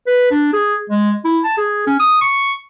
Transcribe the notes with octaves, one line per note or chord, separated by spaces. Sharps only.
B4
D4
G#4
G#3
E4
A5
G#4
C#4
D#6
C#6